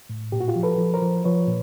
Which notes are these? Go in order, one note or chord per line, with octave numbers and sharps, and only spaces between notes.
A2
A#2 G4
F#4
F4 G4
F3
A4 B4
F3
A#4 C5
F3
F3 B4 C#5
A#2